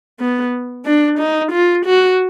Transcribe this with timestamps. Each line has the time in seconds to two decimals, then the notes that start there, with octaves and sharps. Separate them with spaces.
0.20 B3
0.85 D4
1.19 D#4
1.52 F4
1.85 F#4